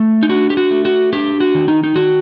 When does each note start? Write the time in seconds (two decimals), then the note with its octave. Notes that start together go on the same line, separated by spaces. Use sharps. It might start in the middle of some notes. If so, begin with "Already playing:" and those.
Already playing: A3
0.23 D#4
0.29 D4 F#4
0.50 G4
0.57 F#4
0.71 A3
0.85 F#4
1.13 D4 G4
1.40 F#4
1.55 D#3
1.68 D#4
1.84 D#4
1.95 D#3 F#4